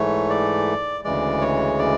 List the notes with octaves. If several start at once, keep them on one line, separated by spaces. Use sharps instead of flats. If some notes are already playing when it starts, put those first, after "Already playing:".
Already playing: G#2 E3 A3 C#5
D5
D2 C#3 E3 G#3 D5
C#5
D5